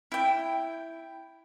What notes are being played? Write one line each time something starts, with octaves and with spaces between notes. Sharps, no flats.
E4 G5